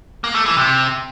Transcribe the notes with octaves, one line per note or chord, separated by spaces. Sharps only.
A#3
A3
E3
C3